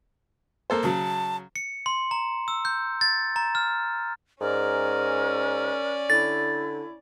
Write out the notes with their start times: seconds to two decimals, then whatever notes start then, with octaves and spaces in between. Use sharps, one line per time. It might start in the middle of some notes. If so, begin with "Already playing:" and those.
0.70 A#3 A4 C5
0.83 C#3 F#3 A5
1.56 C#7
1.86 C6
2.11 A#5
2.48 E6
2.65 G6
3.01 A6
3.36 A#5
3.55 F6
4.41 G#2 C#4 A#4 D5
6.10 D3 E4 A6